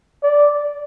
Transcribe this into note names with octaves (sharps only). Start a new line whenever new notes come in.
D5